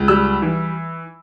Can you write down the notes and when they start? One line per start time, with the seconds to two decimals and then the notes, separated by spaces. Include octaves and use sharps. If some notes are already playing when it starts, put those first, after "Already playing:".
Already playing: C#2
0.08 G3 E6
0.42 E3